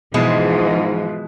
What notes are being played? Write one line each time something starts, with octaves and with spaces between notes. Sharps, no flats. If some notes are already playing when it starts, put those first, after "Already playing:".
G#2 B2 E3 F3 G#3